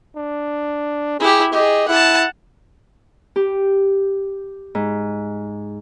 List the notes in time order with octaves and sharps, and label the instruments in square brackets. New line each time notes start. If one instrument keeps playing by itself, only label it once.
[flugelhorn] D4
[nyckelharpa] E4 G4 [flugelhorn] G#4
[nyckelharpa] G4 G#4 [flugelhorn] D#5
[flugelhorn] E4 [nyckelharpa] F#5 A5
[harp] G4
G#2